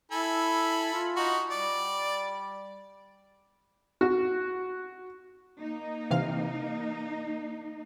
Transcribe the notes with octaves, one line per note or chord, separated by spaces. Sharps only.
E4 A4 G#5 B5
F4
D#4 F#4
G3 D5
F#4
A#3 D#4
C3 E3 F5